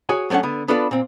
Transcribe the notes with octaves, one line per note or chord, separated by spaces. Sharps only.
F#4 G#4 C#5 G#5
F#3 A3 C#4 D4 F#5
D3 B3
B3 D4 F4 A4 B4 D5
A#2 C4